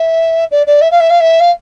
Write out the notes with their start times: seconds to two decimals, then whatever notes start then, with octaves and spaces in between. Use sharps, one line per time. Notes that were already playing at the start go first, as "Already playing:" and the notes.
Already playing: E5
0.51 D5
0.67 D5
0.81 E5
0.91 F5
1.00 E5
1.10 F5
1.20 E5
1.40 F5